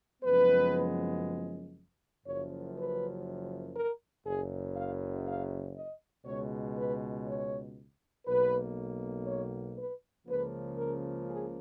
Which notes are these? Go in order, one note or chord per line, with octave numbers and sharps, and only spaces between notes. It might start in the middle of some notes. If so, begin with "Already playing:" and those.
F#1 F#2 F3 G#3 B3 B4
F#1 F#2 F3 C#5
B4
A#4
F#1 F#2 C#3 G#4
F5
F5
D#5
C#2 B2 G#3 C#5
B4
C#5
B1 B2 A#3 B4
C#5
B4
C#2 C#3 F3 A#3 B4
A#4
G#4